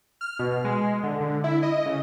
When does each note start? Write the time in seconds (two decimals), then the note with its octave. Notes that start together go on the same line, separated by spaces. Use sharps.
0.21 F6
0.39 B2
0.64 G#3
1.03 D3
1.20 D3
1.44 E4
1.63 D#5
1.86 C#3